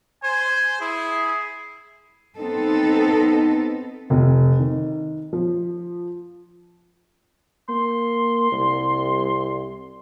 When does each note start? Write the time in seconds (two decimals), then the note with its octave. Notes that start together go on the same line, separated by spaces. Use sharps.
0.23 C5 G#5
0.81 E4 G#4
2.37 B3 C4 D#4 A4
4.10 F1
4.59 D#3
5.33 F3
7.69 A#3 C6
8.52 C2